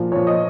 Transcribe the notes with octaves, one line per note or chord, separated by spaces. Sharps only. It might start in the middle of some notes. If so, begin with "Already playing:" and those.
Already playing: A#2 F3
A#2 F3 C#5
D#5